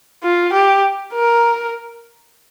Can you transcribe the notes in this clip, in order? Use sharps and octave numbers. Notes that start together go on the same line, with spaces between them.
F4
G4
A#4